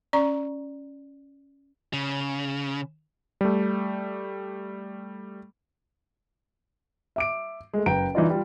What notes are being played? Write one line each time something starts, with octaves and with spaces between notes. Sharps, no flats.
C#4 D5 A#5 C#6
C#3
G3 A3
E5 D6 D7
G#3 A3
F#1 B4 G5 A#5 D7
E3 D#4 F4 D5
G3 F4